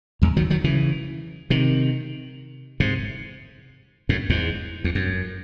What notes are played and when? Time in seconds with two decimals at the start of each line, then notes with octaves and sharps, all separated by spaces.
0.22 E2 G#2
0.37 D#3 F#3
0.50 D#3 F#3
0.64 C#3 E3
1.50 C3 D#3
2.80 G#2 C3
4.09 F#2 A2
4.30 E2 G#2
4.84 E2
4.95 F#2